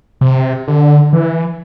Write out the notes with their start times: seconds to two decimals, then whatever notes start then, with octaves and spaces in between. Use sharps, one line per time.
0.21 C3
0.68 D3
1.13 E3